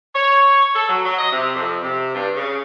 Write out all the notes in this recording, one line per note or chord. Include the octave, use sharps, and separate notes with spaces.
C#5
A4
F#3
F#3
D#5
C3
F2
C3
G2
C#3